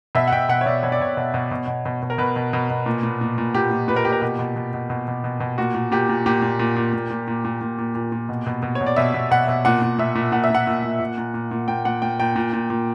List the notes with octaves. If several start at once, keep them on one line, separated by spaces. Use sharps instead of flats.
B2 E5
F#5
B2 G5
B2 F#5
C#5
B2 D5
B2 C#5
D5
B2 C#5
B2
B2
B2
B2
B2
B2
A#4
B2 B4
B2
B2
B2
A#2
A#2
A#2
A#2
A#2 G4
A#2
A#2 B4
A#4
A#2 G4
A#4
B2 G4
B2
B2
B2
B2
B2
B2
B2
A#2 F#4
A#2
A#2 G4
A#2
A#2 G4
A#2
A#2
A#2
A#2
A#2
A#2
A#2
A#2
A#2
A#2
A#2
B2
B2
B2
C#5
B2
D5
B2 E5
B2
B2 F#5
B2
A#2 F#5
A#2
A#2 E5
A#2
A#2 F#5
E5
A#2 F#5
A#2
A#2
A#2
A#2
A#2
A#2
A#2 G5
A#2 F#5
A#2 G5
A#2 G5
A#2
A#2
A#2